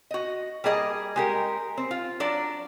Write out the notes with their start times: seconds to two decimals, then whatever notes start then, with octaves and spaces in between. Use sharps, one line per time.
0.11 F#4 D#5
0.64 G3 A#3 G#4 D#5
1.16 G#3 G4 A#4
1.77 C4
1.91 F4
2.20 F#3 D4 D5